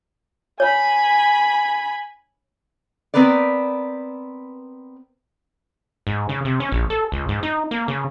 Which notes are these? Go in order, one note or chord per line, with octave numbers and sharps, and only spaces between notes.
C#5 G#5 B5
B3 C4 A#4 B4 D5
G#2
C#3
C3
C#4
A#1
A4
C#2
G#2
D#4
A#3
C#3